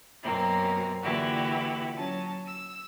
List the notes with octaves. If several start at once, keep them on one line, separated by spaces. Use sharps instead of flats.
F#2 B2 A#3 C4
A#2 D3 E3 E4 F#4 G4
F#3 C#4 A5
E6